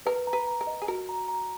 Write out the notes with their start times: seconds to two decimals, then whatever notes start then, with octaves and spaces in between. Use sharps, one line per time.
0.06 A#4 B4
0.27 A#5
0.33 B4
0.47 A#5
0.61 A#4
0.67 D#5
0.82 G#4
0.88 F#4 A#4
1.09 A#5
1.29 A#5